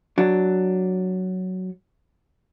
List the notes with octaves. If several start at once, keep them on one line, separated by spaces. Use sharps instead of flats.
F#3 D4